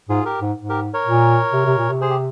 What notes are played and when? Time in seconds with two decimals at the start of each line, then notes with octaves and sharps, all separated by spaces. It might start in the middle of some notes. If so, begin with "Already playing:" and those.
0.09 G#2 F4 G#4
0.25 G4 A#4
0.41 G#2
0.58 G#2
0.69 G4 A#4
0.94 A#4 C#5
1.05 A#2
1.53 C3
1.66 C3
1.78 A#2
1.89 C3
2.01 G#4 C5
2.10 G4